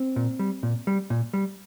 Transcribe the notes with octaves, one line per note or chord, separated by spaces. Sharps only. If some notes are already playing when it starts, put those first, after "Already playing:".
Already playing: C4
A#2
G3
A#2
G3
A#2
G3